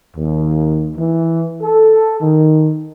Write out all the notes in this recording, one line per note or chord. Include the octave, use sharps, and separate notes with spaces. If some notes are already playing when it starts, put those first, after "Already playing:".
D#2
E3
A4
D#3